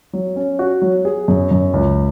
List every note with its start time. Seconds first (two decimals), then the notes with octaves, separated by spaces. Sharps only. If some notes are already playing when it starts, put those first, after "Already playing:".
0.13 F#3
0.36 C#4
0.59 F#4
0.82 F#3
1.05 G#4
1.28 F#2
1.51 F#2
1.74 C#2